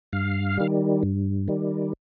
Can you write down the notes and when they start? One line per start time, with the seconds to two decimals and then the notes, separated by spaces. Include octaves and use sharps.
0.13 G2 F5
0.57 D#3 G3
1.03 G2
1.48 D#3 G3